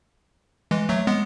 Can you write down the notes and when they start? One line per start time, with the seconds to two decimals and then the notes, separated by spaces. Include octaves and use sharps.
0.71 E3 G#3
0.89 F#3 A3
1.07 G#3 B3